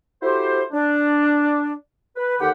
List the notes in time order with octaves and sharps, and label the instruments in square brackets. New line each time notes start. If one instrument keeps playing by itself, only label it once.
[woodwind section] E4 F#4 G4 A4 C5
D4
B4
D#2 D3 G4 F#5